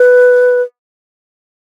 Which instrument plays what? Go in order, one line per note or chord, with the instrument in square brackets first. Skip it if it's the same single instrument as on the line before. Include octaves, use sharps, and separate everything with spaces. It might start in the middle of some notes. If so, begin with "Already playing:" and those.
Already playing: [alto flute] B4